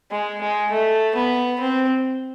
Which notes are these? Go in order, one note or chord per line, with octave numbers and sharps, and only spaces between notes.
G#3
G#3
A3
B3
C4